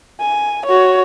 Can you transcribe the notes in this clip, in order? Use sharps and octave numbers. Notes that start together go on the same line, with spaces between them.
G#5
F#4 C#5